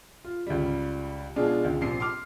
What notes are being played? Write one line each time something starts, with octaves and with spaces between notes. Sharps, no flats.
F4
C#2 G3
B2 G#3 D4 F4 G#4
C#2
A#1 C3 C7
C6 D6 F6